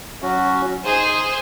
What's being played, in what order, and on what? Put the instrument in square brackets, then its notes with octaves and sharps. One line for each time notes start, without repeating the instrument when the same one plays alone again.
[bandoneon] F#3 C#4 F#4
[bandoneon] D#4 [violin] G#4 C5